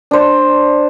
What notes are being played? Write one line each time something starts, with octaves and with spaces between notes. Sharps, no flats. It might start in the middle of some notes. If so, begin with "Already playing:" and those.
D4 C5